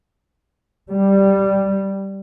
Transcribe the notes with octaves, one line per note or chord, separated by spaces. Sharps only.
G3